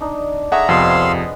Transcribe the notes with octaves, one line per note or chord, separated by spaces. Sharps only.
D4 D#4
A3 G#4 E5 F#5 A#5
F2 C3 G#3 B3 F5 C6 E6